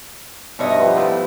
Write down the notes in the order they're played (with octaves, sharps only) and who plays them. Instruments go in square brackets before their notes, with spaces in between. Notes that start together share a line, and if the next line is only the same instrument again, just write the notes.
[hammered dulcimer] G2 D#4 E5 [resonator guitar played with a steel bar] B2 C#5 D#5
[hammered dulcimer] F3 B3 G4
[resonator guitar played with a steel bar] A2 E4 [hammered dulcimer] F3